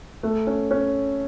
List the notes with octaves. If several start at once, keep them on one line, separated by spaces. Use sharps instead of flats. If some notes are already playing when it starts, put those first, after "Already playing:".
A3
C#4
C#4